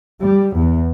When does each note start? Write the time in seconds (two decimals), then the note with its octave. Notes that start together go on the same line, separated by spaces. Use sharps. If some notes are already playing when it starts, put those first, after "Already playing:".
0.21 G3
0.57 E2